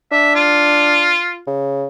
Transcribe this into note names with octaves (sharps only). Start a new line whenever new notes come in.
D4 E5
F4
C#3